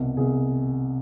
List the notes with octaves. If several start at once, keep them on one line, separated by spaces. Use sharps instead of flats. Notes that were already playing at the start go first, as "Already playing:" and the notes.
Already playing: C2 B2
C2 B2 G#4